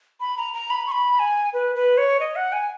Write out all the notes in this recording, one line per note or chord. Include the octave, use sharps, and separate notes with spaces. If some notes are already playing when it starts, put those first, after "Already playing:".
B5
A#5
A#5
B5
C#6
B5
G#5
B4
B4
C#5
D#5
F#5
G#5